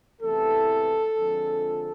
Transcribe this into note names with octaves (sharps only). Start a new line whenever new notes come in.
E2 C3 E3 A3 A4
F2 D3 F3 G#3